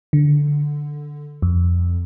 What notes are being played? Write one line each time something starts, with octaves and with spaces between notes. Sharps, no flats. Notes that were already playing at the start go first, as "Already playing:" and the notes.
D3
F2